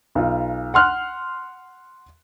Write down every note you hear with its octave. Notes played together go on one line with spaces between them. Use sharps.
B1 F4
F#5 C6 F6 F#6